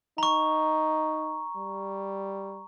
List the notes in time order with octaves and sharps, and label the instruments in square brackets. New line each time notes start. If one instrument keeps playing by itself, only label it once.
[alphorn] D#4 [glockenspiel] A#5 C#6
[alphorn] G3